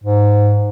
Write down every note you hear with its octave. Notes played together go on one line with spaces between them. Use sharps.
G#2